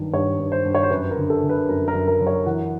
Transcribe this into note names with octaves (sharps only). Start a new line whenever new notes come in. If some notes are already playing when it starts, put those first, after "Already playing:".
Already playing: G2 D#3 F#3
G2 C#5
G2
C5
G2
C#5
C5
F#2 B4
A#4
D3
A4
D3
B4
F#2 A#4
A#4
F#2
A#4
F#3
C#5
E3 F#5